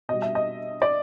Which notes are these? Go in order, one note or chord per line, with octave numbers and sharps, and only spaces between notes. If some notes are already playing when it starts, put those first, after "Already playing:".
B2 G3 D#5
E5
D#5
D5